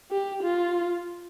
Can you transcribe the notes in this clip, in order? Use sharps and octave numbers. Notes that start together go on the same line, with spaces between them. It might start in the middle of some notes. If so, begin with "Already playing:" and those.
G4
F4